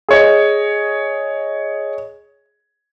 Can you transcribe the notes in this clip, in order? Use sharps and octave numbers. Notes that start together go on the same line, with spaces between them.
G#4 C#5 D#5